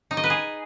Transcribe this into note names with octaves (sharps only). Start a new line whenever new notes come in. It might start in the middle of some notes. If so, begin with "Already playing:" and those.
D#4
D#5
B4
G#4